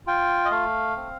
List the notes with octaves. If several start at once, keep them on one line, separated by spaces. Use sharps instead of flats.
F4 G5
D#5
A3 F5
C4